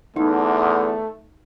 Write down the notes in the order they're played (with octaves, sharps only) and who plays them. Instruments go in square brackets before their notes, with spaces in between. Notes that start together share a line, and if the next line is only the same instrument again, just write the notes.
[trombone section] E2 D3 [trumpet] A3 [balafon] D#4